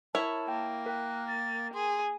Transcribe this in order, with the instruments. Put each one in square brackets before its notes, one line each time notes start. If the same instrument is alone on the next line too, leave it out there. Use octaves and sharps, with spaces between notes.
[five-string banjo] E4 C#5 [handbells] A#4 [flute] A5
[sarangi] A#3 [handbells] G5
[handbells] A#4 G5 [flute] F#6
[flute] A6
[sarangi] G#4 [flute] C6